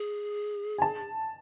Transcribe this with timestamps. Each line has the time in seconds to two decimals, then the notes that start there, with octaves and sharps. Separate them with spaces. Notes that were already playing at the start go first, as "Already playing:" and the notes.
Already playing: G#4
0.78 G#5
0.82 A5